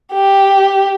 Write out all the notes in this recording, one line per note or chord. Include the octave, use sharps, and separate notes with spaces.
G4